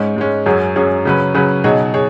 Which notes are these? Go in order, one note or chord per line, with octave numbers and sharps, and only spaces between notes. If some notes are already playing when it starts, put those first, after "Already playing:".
Already playing: G#2 G#3 C#4
G#2 G#3 C#4
F#2 F#3 C#4 G#4
F#2 F#3 C#4 G#4
C#3 F#3 C#4 B4
C#3 F#3 C#4 B4
B2 F#3 D#4 G#4 C#5
G#4 C#5